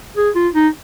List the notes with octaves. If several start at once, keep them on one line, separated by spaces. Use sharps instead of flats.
G#4
F4
D#4